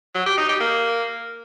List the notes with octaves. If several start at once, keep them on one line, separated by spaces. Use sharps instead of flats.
F#3
G4
D#4
G4
A#3